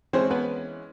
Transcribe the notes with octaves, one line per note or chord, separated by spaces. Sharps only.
E3 G#3 C4 C#4 C5
B3 B4